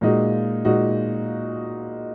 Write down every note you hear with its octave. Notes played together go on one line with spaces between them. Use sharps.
A#2 G#3 D#4 F#4
A#2 G#3 D#4 F#4